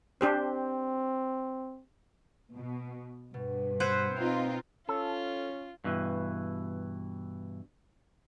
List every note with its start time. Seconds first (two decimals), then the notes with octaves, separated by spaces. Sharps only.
0.21 C4 D4 G4 C5
2.54 B2
3.34 G2 B2
3.80 B4 C5 F#5 E6 G6 G#6
4.16 C4 D#4 F4 F5
4.89 C#4 F4 A4
5.84 G2 B2 E3